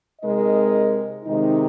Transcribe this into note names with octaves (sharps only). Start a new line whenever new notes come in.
C3 G#3 D#4 A#4 D#5
C3 D#3 G#3 D#4